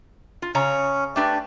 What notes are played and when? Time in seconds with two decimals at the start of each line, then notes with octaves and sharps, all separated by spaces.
0.42 F4
0.55 C#3 C#4 C#5 A#5
1.16 A3 D4 G4 B4 D5